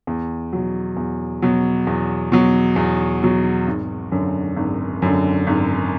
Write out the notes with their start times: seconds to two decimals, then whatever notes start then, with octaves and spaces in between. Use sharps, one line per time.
0.07 E2
0.53 B2 F#3
0.97 E2
1.42 B2 F#3
1.87 E2
2.32 B2 F#3
2.76 E2
3.22 B2 F#3
3.67 G#1
4.12 F#2 D3
4.57 G#1
5.02 F#2 D3
5.47 G#1